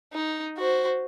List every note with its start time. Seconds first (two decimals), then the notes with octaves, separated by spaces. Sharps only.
0.13 D#4
0.58 F#4 C5